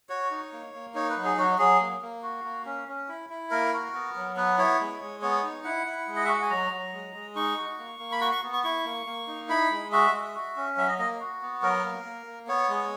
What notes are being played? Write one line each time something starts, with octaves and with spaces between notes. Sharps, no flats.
F#4 C#5
D#4
A#3
A#3
D#4 C#5
B4
F#3
G#4
F#3 F#4
F#3 G#4
A#3
A#3
F#4
A#3
C#4
C#4
E4
E4
A#3 A#4
F#4
B3
F#3
B3 B4
E4 C#5
G#3
G#3
B3 C#5
D#4
E4 F#5
E4
G#3
D#5
E5
F#4
F#5
G#5
F#3 A#5
F#3
G#3
G#3
D#4 C#6
F#4
A#3
A#3
B5
F#4 C#6
C#6
B3
C#6
E4 C#6
A#3
A#3
D#4
E4 B5
G#3
F#4 E5
G#3
F#4
C#4
F#3 E5
D#5
A#3 D#5
F#4
B3
F#3 A#4
A#3
A#3
A#3
B3 C#5
G#3